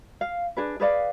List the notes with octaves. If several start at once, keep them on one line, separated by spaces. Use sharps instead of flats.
F5
D4 G#4 B4
G#4 B4 D5 F5